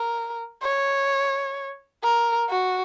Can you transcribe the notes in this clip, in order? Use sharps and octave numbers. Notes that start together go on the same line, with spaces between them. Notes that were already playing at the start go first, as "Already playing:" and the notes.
Already playing: A#4
C#5
A#4
F#4